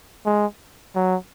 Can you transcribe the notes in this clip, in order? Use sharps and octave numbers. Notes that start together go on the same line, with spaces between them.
G#3
F#3